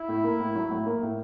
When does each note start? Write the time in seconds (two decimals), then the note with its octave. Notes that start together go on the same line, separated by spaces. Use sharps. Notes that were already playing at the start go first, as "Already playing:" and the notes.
Already playing: E4
0.08 A2
0.24 A#3
0.40 A2
0.55 F#3
0.71 A2
0.86 A#3
1.03 A2